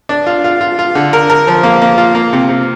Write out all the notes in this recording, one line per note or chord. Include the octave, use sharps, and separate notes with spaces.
D4
F4
F4
F4
F4
D3
A#4
A#4
F3
A#3
A#3
F4
A#3
C3
C3